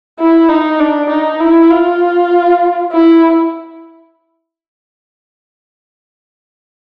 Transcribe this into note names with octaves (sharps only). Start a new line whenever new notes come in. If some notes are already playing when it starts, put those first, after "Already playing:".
E4
D#4
D4
D#4
E4
F4
E4